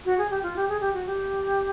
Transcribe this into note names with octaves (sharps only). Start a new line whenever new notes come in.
F#4
G#4
G4
F4
G4
G#4
G4
F#4
G4